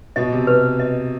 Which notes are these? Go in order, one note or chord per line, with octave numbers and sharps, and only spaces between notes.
B2 D#5
C3
B4
D#5